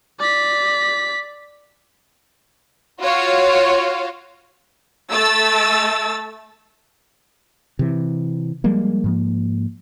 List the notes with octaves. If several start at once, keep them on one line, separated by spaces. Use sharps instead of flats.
D5 B6
F4 F#4 C#5 F5
A3 E6 A6
C3 E3
F3 G3 G#3 A#3
G#2 F3 A#3